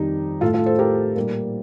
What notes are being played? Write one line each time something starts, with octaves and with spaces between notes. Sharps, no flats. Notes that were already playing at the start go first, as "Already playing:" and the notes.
Already playing: F2 D#3 G3 D#4 G4
A2 A3 F4 A4
F4 A4
A4 C5
G4 A#4
A#2 G3 A#3